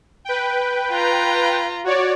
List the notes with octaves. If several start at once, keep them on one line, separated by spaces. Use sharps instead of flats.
B4 G5
F4 A#5
F#4 C#5 D5